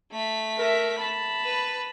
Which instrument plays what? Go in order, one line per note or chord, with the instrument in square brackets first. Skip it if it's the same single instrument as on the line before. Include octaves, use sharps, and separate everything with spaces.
[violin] A3 B6
[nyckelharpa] A#4 E5
A5 B5
[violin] B4